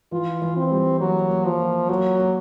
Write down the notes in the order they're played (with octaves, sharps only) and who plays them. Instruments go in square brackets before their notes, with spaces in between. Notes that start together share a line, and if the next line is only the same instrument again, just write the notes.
[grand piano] E3 [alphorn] F4
[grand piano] E3
[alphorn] C4
[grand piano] G3
[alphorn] F#3 [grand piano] A#3
[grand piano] A#3
[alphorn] F3
[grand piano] A#3
[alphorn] F#3 [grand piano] A#3
[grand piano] A#3